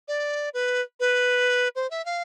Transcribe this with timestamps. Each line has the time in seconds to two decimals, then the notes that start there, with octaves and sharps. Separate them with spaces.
0.08 D5
0.54 B4
1.00 B4
1.76 C5
1.91 E5
2.05 F5